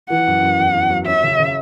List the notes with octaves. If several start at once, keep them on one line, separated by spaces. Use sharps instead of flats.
E3 F#5
F#2
F#2
E2
E2
F#3
C#4 E5
C#3
C#3